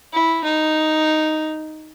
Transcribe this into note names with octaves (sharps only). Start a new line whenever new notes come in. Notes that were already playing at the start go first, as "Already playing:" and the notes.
E4
D#4